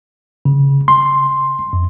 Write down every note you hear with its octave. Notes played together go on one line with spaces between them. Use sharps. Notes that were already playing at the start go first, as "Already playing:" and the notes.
C#3
C6
F2